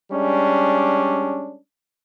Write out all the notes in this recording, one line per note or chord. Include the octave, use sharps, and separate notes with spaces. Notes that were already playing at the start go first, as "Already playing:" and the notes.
G3 G#3 C#4 D4